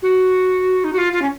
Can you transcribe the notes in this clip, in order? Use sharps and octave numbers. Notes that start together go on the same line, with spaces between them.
F#4
D#4
F#4
F4
F4
C#4